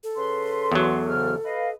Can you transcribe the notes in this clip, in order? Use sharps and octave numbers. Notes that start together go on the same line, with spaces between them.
A4
C#3 B4 C6
E2 F#3
G#2 C#3 F6
B4 D#5 F5